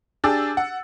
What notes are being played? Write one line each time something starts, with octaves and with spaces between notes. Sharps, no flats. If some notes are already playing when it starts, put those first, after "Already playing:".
D4 G4 G#4 D6 E6 A6
F#5